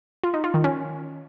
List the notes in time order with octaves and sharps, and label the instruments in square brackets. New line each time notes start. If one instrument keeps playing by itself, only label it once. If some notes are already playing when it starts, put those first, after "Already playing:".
[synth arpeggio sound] F4
D#4
F4
D#3
C#4